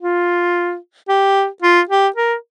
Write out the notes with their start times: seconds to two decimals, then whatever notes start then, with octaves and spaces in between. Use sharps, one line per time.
0.01 F4
1.08 G4
1.62 F4
1.89 G4
2.16 A#4